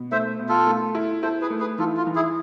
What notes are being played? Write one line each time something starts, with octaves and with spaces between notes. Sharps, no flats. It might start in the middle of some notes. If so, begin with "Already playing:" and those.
Already playing: B2
A3 C5 E5
B2
F4 A4
A3
E4
E4 A4 C5
G#4 B4
A3
G#4 B4
E3 F4 A4
F4
E3
E4 G#4